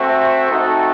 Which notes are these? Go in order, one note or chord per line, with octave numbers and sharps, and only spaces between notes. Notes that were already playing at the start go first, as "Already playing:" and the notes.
Already playing: A3 C4 F#4 C5 E5
A3 C4 D#4 F#4 A4